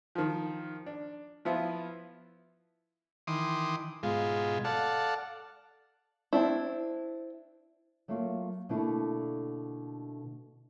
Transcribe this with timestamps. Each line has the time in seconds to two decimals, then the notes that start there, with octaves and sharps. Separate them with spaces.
0.15 D#3 F3
0.86 D4
1.45 F3 B3 E4 F4
3.27 D#3 E3 C6 D6 D#6
4.03 G#2 B2 G#3 F4
4.64 A4 D5 F5 F#5 A5
6.33 C4 D4 E4
8.08 F#3 A3 A#3 F4 F5
8.69 B2 D3 A3 A#3 D4 E4